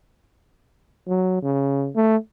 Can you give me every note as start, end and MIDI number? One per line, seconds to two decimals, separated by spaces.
1.08 1.42 54
1.42 1.89 49
1.95 2.16 57